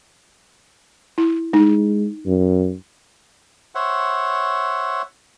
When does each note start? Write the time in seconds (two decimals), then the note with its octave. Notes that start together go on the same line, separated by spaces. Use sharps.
1.18 E4
1.53 G#3 D#4
2.26 F#2
3.75 C5 C#5 E5 F#5